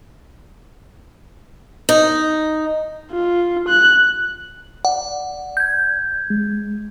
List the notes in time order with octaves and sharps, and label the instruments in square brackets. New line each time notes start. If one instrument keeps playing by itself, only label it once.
[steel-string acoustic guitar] D#4
[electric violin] F4
F#6
[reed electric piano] D5 [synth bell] F#5
[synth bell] G6 G#6
[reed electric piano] G#3